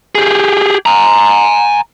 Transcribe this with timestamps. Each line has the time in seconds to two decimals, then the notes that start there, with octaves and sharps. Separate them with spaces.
0.15 G4 G#4
0.86 G#5 A#5